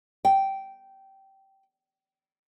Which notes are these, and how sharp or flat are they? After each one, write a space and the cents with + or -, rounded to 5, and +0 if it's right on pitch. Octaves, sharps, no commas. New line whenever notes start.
G5 -15